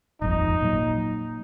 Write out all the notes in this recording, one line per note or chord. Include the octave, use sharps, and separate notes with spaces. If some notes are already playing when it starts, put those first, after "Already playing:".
D#1 G#1 F2 D#4
A#2 F#3